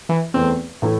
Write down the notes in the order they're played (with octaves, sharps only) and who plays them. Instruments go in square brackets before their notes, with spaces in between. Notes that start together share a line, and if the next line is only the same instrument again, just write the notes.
[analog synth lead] E3
[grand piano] E2 E3 A3 [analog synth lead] C4
[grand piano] A2 E3 A3 E4